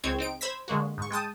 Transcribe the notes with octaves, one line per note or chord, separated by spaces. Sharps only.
C#2 G#3 C4 C#5 G#6
C4 D#4 D7
C5 B5 E6 G#6 A#6 B6
D3 G#3 A#3 F#4
G#2 C#6
G#3 G5 A5 D#6